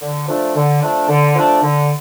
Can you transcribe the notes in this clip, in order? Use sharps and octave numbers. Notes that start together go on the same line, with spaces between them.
D3
F3 A3 D4
D3
F3 A3 D4
D3
F3 A3 D4
D3